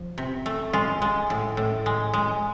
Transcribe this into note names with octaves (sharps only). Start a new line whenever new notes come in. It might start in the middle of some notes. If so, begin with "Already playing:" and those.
Already playing: F3
C3
A3
G#3 F4
G#3
A2
A2
G#3
G#3